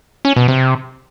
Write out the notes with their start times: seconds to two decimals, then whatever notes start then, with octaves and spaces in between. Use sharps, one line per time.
0.25 C#4
0.36 B2
0.48 C3